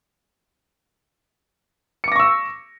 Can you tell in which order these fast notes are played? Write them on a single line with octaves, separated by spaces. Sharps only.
C#7 D6 A#6 C#6 E6